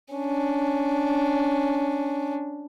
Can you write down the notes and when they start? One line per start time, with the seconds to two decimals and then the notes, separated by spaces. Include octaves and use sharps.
0.14 C#4 D4